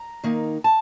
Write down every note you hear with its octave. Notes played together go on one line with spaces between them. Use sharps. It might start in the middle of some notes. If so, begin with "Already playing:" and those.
Already playing: A#5
D#3 A#3 D#4
A5